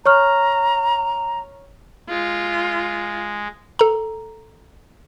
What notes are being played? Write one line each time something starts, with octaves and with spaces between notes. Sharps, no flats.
C#5 A#5 C#6 F6
G#3 F4
A4 A#5